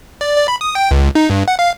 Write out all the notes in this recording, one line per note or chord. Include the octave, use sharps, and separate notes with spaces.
D5
D5
B5
D#6
G5
C#2
D#4
G2
F#5
F5